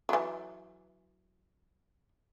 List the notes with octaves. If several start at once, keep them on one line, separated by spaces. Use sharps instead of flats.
E3 F#3